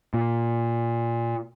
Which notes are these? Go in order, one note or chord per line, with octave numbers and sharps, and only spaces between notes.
A#2